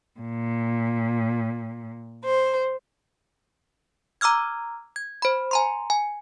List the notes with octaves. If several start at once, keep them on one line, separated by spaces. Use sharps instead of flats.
A#2
C5
A#5 D6 E6 F6 G#6
G#6
C5 B5
G#5 A#5 C6
G#5